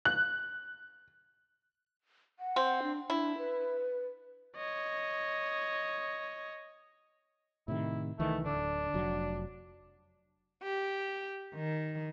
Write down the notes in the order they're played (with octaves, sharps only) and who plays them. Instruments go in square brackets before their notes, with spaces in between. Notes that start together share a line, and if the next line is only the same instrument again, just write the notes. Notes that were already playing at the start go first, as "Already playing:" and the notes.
[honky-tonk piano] F#6
[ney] F#5
[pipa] C4
[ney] D4
[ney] D4 [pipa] E4
[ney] B4
[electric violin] C#5 D#5
[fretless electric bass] A2 C3 D#3 [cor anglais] E4
[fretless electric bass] C2 D#3 E3 [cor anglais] A3
[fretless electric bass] D1 D3 [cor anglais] D4
[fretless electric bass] F1 F#3
[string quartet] G4
D#3